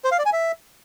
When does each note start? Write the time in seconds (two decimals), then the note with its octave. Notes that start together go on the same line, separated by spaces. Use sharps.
0.04 C5
0.11 F5
0.19 D5
0.26 G#5
0.33 E5